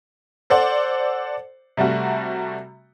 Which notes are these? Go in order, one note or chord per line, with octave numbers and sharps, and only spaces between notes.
A4 C5 D5 F#5
C3 G3 A3 F#4